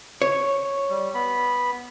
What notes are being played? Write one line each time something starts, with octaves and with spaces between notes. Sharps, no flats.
C#5
G3
B3 B5